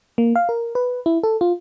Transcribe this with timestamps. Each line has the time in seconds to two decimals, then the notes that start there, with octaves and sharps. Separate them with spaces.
0.18 A#3
0.36 F5
0.49 A#4
0.75 B4
1.06 E4
1.23 A4
1.41 F4